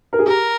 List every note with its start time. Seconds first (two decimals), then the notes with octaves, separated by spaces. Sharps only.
0.13 A#4
0.19 G#4
0.26 G4 A#4